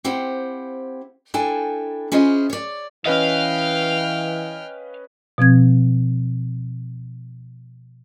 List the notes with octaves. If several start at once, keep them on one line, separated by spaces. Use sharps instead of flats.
C4 E4 G4 C5 F5 F#5
D4 E4 A4 G5 G#5
C#4 E4 F4 G#4 C5 D#5
C#5 D5
E3 C#4 B4 D#5 F5 G5 F6
B2 F3 C4 G#6